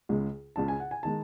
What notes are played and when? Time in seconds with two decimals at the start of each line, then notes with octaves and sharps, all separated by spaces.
0.09 C#2 C#3 G#3
0.56 C#2 C#3 G#3 A5
0.68 G#5
0.80 F#5
0.91 G#5
1.03 D#3 G#3 A5